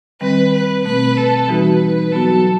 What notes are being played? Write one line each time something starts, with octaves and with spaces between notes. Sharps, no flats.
D#3 G3 C4 B4
B4
B2 A3 C4 B4
A4
E3 G3 D#4 F#4 B4
F#3 B3 F#4 A4